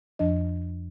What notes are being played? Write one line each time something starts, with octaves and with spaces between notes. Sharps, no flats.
F2 F3 D4 D#5